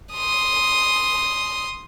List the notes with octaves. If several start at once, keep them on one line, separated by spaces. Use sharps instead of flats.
C6 D#6